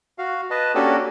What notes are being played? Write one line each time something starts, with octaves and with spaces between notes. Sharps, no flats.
F#4 F5
B4 D#5 A5
A#3 C#4 D4 F#4 G4 A4